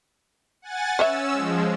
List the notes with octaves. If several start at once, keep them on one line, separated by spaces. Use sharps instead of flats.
F#5 G#5 A6
C#4 B4 C#5 E5 E6
F3 G#3